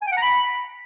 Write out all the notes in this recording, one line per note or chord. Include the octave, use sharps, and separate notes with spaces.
G#5
G5
F#5
A#5
B5